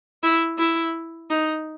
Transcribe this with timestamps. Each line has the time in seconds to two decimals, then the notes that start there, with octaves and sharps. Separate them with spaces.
0.23 E4
0.58 E4
1.30 D#4